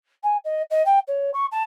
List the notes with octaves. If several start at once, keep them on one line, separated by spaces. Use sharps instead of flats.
G#5
D#5
D#5
G5
C#5
C#6
A5